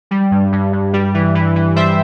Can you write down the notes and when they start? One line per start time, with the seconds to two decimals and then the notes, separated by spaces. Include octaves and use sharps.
0.11 G3
0.31 G2
0.53 G2
0.73 G2
0.93 G3
1.14 E3
1.35 E3
1.56 E3
1.76 G3 C5 E5